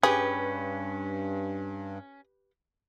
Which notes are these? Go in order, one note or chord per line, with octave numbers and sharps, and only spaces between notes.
G2 C#4 G4 G#4 B4